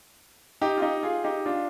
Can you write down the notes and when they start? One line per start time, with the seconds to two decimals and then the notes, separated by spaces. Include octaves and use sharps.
0.61 D#4 G4
0.78 F4
0.82 D#4 G4
1.03 F4 G#4
1.24 D#4 G4
1.45 D4 F4